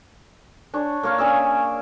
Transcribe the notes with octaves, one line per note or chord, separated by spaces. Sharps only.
D4 C#5
A#3 C#5 F5
C#4 G#4 D5 E5